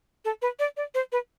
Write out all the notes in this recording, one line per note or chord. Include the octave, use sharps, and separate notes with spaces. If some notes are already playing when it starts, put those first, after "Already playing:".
A4
B4
D5
D5
C5
B4